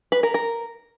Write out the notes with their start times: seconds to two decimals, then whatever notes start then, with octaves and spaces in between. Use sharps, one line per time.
0.12 B4
0.23 A#4
0.34 A#4